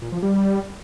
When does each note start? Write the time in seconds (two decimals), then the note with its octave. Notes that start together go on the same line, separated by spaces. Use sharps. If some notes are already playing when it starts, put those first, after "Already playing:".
0.02 A#2
0.12 F3
0.23 G3